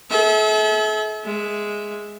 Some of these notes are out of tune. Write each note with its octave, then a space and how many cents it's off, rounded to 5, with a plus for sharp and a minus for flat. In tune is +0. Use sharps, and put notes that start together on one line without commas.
A4 -45 E5 -30
G#3 +0 E5 +0